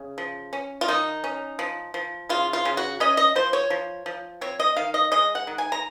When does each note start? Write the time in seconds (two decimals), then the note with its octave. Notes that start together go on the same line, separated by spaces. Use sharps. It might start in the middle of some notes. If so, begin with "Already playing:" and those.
Already playing: C#3
0.18 F3
0.53 C#4
0.81 F4
0.88 D#3 D#4
1.24 C#4
1.59 F3
1.94 F3
2.29 C#3 F4
2.53 F4
2.65 C#3
2.77 F#4
3.00 C#4 D#5
3.17 D#5
3.35 F3 C5
3.53 C#5
3.70 F3
4.06 F3
4.41 C4 C#5
4.60 D#5
4.76 D#3 F5
4.94 D#5
5.12 G#3 D#5
5.35 F#5
5.47 D#3
5.58 G#5
5.72 A#5